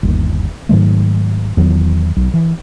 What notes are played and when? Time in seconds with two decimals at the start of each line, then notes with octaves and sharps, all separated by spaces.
0.03 G1 D#2
0.69 G#2 D#3 F#3 A3
1.57 E2 D#3 F#3
2.17 B1
2.34 E3